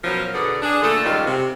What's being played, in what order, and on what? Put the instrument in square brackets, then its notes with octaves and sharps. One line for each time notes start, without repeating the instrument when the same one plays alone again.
[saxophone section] B2 F3 F#3 C#4 A#4
B2 D3 B3 G#4 D5
D4 G#4 D5
A#2 D3 A3 A4
F2 G#2 D#3 G3 C#4 F4
C3